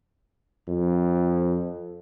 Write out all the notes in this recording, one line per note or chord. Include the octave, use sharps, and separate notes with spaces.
F2